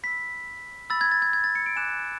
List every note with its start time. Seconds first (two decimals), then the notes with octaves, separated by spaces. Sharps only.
0.03 B5 E6 B6
0.90 B5 E6 A6
1.01 G#6
1.12 A6
1.22 G#6
1.33 G#6
1.44 A6
1.55 C#7
1.66 D7
1.76 G#5 D6 F#6 E7